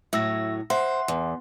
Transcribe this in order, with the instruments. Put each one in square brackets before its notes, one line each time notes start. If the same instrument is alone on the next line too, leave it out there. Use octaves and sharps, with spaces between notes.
[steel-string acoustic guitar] A2 F#3 [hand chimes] E5 E6 A#6
[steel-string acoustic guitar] C5 [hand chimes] E5 F#5 C6
[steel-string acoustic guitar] E2